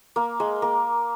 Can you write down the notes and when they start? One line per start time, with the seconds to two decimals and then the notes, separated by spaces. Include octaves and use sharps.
0.16 A#3
0.40 G#3
0.62 A#3